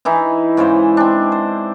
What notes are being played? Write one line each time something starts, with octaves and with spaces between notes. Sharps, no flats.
E3 D#4 E4
G#2 C#3 E4 C5
C4 D4
C5